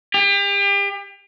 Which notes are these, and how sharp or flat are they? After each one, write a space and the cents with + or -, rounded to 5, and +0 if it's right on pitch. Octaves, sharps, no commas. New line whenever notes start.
G4 +35